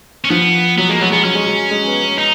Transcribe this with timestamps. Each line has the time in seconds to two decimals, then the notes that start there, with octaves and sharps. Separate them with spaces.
0.25 C#4
0.30 F3 B3
0.78 F#3 B3
0.89 G#3 A#3
1.00 F#3 B3
1.12 G#3 B3
1.24 F#3 C#4
1.35 G#3
1.46 F#3
1.71 G#3
1.87 B3
2.03 B3
2.18 D#4